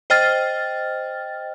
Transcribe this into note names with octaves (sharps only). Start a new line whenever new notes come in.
C5 D#5 G5 F6 A6